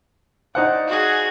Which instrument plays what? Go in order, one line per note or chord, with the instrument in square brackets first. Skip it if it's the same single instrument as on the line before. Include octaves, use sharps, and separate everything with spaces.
[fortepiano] D#4 C5 F#5 [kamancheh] D5
[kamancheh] F#4 G#4